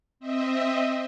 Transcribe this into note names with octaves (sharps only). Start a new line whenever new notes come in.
C4 D#5 E5